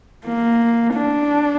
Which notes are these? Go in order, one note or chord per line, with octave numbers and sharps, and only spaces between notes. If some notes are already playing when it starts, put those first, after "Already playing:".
A#3
D4